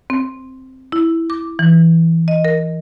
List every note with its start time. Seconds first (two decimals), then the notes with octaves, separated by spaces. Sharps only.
0.10 C4
0.92 E4
1.30 D6
1.59 E3
2.28 D#5
2.45 A#4